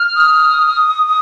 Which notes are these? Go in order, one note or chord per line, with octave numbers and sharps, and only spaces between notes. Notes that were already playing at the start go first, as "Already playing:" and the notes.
Already playing: F6
D#6